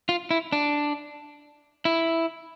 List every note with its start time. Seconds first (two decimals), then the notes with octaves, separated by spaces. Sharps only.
0.09 F4
0.31 E4
0.52 D4
1.85 E4